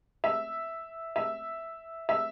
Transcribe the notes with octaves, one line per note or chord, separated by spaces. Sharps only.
E5
E5
E5